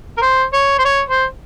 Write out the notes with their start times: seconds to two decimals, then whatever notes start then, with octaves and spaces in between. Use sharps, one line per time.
0.17 A#4
0.22 C5
0.53 C#5
0.79 C5
0.85 C#5
1.09 C5